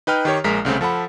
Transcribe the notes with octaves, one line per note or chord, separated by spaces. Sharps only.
D#4 B4 G5 F6
D#3 G4 C#5
A#1 G#3 A#4 B6
C2 C#3 A3 C4
F3 A4 F#5 B5